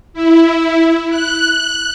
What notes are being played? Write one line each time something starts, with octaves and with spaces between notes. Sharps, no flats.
E4
F#6